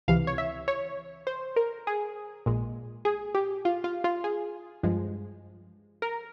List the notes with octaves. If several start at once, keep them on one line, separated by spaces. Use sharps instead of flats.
C#2 C3 E3 F5
C#5
E5
C#5
C5
A#4
G#4
A#1 A#2 G#3
G#4
G4
F4
F4
F4
G#4
G2 F3 G#3
A#4